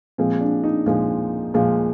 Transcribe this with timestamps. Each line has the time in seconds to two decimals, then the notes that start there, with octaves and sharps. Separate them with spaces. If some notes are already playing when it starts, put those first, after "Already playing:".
0.18 A#2 F3 G#3 C4
0.41 D4
0.63 D#4
0.86 A#2 F3 G#3
1.54 A#2 F3 G#3